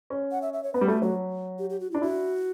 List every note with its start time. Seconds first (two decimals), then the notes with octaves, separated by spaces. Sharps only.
0.10 C#4
0.31 F#5
0.42 E5
0.53 E5
0.63 C#5
0.74 B3 B4
0.81 G3
0.88 A3 F#4
1.02 F#3 F#4
1.59 G4
1.70 G4
1.80 F#4
1.91 D4 E4
2.02 E4 F#4